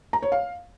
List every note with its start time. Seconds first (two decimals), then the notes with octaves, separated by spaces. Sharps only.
0.13 A#5
0.22 C#5
0.32 F5